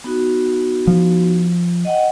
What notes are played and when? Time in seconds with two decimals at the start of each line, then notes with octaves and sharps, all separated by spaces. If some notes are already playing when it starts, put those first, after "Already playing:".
0.04 B3 D#4 F#4
0.87 F3
1.85 D#5 F#5 G5